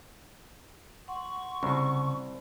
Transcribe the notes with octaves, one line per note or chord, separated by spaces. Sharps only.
F#5 C6 C#6
C2 C#3